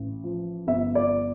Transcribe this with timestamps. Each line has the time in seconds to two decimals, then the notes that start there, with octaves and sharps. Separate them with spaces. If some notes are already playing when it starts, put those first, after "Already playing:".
Already playing: A1
0.24 F3
0.67 G1 E5
0.95 D5